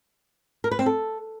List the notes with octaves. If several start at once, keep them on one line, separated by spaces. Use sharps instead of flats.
A#4
B4
C4
A4